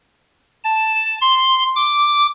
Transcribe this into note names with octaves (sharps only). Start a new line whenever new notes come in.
A5
C6
D6